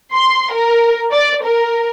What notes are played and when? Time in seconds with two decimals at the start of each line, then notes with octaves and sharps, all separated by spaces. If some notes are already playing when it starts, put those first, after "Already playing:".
0.14 C6
0.53 A#4
1.12 D5
1.44 A#4